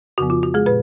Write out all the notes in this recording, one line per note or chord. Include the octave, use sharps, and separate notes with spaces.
F2 C#3 F3 B3 F#4
F4
F#4
G#3 G#4
A#2 B4